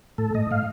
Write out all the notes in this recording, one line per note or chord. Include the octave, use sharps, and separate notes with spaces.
A2 A4
A2 D#5
A2 F5